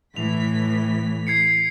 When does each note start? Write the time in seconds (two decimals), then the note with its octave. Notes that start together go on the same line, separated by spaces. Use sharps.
0.16 A2 E3 B6 F7
1.27 G#6 C7 C#7